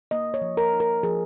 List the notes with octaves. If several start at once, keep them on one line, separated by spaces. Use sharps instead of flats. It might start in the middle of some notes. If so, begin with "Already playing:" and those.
A#3 D#5
C#5
F3
A#4
D#4
A#4
F3 G#4